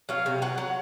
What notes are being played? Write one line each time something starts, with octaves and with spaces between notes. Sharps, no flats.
F#3 F5
C3
F#3 F#5
F#3